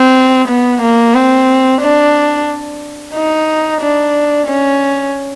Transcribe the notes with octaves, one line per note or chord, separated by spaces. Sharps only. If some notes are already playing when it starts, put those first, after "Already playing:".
Already playing: C4
B3
A#3
C4
D4
D#4
D4
C#4